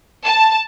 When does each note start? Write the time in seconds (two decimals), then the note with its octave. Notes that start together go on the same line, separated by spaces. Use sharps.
0.25 A5